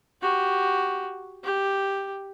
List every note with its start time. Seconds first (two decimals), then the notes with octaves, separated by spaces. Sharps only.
0.22 F#4 G4
1.44 G4